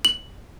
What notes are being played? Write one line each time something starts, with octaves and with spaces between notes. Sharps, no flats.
F#7